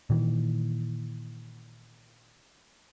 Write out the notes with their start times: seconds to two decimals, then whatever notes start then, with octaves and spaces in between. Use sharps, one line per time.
0.10 A#2 D#3 E3